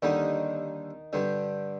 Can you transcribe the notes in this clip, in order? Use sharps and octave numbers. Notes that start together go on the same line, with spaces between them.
D#2 D3 D#3 G3 D#4
G2 D3 G3